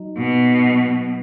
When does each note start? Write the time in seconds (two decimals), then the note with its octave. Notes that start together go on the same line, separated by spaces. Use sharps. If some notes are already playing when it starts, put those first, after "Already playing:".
Already playing: F#3 D#4
0.18 B2